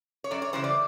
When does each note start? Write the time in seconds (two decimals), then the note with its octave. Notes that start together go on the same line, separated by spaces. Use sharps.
0.24 C#5
0.31 F#2 D5
0.42 C#5
0.53 C#3 E3 G3 C5
0.64 D5